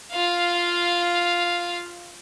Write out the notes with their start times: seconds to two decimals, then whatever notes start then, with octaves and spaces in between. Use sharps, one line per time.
0.12 F4 F5